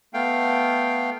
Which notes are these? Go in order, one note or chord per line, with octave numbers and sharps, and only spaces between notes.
A3 B3 F5 G5